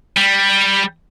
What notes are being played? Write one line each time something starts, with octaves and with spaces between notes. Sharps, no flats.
G3